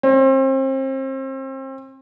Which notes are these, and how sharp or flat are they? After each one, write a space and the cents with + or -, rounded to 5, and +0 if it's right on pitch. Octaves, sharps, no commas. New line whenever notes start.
C4 +35